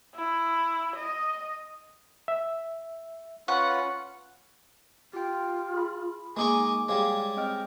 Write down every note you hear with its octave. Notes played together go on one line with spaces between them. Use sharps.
E4
D#5
E5
C#4 F4 B4 F#5 C#6
F4 G4 G5
G#4 B5
G#3 A#3 D#4 G#5 C#6 D6
G3 G#3 C#5 F5 D6
C4 D#5 G5 F6